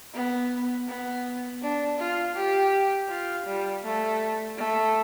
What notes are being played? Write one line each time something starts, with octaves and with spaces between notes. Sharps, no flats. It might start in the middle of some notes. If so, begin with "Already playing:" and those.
B3
B3
D4
F4
G4
F4
G3
A3
A3